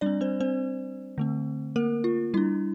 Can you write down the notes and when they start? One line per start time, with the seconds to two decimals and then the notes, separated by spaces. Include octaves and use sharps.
0.01 G3 C4 D4 D5
0.21 C4 C5
0.40 C4 C5
1.18 D3 A3 C4
1.76 A#3 A#4
2.04 F4
2.34 G3 D4 E4